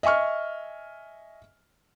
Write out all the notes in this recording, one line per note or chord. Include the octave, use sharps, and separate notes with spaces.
D#5 E5 G#5 C#6 F6